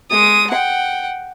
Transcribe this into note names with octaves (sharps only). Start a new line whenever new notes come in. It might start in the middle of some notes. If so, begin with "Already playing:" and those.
G#3 D#6
F#5 G5